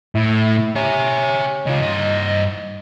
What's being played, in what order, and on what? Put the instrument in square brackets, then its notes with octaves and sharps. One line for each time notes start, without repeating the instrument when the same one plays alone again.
[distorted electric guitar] A2 [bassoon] E4
[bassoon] C#4 [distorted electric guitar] G4 E5
[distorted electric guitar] C#3 F4 [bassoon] D#4
[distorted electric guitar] G2 D#5